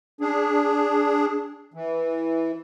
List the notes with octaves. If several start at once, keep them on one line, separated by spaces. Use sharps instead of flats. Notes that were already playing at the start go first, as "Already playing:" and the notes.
D4 G#4
E3